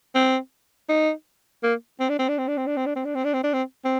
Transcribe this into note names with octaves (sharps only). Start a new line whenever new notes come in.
C4
D#4
A#3
C4
D4
C4
D4
C4
D4
C4
D4
C4
D4
C4
D4
C4
D4
C4
D4
C4
C4